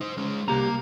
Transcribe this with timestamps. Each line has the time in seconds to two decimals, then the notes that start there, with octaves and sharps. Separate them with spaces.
0.01 D#4 C5
0.17 G#3 C#4
0.48 C2 A#3 G4 A#5